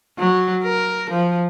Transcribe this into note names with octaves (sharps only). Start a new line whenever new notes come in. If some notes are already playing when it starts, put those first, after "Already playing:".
F#3
A#4
F3